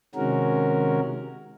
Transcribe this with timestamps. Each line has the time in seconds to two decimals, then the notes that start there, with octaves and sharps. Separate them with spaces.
0.15 C3 D#3 G#3 C#4 F#4 A#4